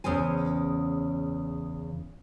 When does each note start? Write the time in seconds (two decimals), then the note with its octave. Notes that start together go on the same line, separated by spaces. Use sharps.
0.04 E2 C#3 B3 C5 G#5